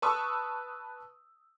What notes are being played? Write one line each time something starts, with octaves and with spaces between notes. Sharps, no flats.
B4 A5 C#6 D#6 E6